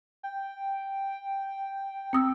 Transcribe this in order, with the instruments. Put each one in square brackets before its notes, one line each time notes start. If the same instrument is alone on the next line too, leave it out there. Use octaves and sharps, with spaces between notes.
[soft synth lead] G5
[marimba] C4 D#6 E6